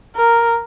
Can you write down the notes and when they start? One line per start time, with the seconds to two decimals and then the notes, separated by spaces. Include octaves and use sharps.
0.16 A#4